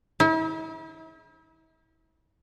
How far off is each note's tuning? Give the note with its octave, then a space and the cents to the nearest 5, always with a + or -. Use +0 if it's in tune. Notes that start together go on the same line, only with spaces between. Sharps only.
E4 -40